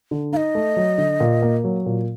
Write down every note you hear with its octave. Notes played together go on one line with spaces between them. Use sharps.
D3
D#4 D#5 F5
A3
F#3
D3
A#2
A#3
F#3
A#2